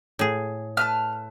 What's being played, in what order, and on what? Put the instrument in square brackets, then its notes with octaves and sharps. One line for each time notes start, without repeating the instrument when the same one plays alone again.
[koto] A2 G#4
[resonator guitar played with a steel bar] A3 B4 A5 [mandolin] F6